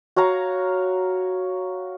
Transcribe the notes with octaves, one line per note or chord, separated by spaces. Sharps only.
F#4 C#5 F5 A#5